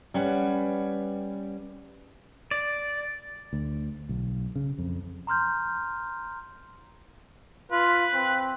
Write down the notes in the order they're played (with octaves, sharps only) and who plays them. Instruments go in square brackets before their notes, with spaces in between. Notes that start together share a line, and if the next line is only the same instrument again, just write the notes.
[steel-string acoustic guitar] G3 C#4 B4 F#5
[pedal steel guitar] D5
[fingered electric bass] D2
B1
C#3
F2
[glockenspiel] A#5 C6 F6 G6
[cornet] F4 [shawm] B4
[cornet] C4